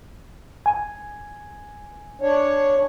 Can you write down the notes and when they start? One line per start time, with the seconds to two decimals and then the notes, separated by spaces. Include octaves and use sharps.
0.66 G#5
2.21 D4 C#5